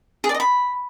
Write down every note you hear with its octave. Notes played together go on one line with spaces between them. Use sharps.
G#4
D5
D#5
B5